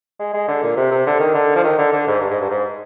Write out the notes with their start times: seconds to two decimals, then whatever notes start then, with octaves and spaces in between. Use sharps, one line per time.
0.19 G#3
0.34 G#3
0.48 D3
0.63 A#2
0.76 C3
0.91 C3
1.06 D3
1.20 D#3
1.34 D3
1.55 F3
1.64 D#3
1.78 D3
1.93 D3
2.07 G#2
2.21 G2
2.31 G#2
2.41 G2
2.50 G#2